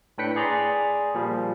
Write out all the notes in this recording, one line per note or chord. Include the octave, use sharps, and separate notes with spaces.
A2 D4 B4 G5 B6 C#7
G#4 D5 A#5 C6
A#2 F3 G3